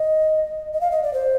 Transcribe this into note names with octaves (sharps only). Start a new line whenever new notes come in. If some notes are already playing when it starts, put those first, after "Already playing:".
Already playing: D#5
D#5
F5
D#5
D5
C5